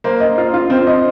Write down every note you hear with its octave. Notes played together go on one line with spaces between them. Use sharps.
A#3 C5
D#5
F4
F4
C4 C5
D#5